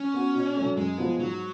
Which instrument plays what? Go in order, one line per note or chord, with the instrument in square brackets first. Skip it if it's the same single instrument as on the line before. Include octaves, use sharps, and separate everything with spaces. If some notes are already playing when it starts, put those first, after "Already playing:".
Already playing: [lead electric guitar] C#4
[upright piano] B3 F#4
B2
F#3 A3
[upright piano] F#2 [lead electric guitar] G#3
[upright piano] F3 B3
[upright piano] G#2 [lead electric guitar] F#3